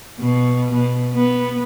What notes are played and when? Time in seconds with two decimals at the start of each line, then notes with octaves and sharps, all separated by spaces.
0.20 B2
0.72 B2
1.13 B3